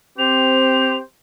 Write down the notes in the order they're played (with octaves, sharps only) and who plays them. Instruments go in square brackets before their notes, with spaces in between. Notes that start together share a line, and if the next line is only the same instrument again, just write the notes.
[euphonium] C4 [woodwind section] G4 C5 [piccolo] F7